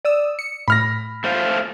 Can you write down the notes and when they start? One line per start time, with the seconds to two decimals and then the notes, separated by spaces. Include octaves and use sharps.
0.05 D5 D#6 E6
0.39 C#7
0.68 A2 B5 F6 A#6
1.24 A3 C5 F5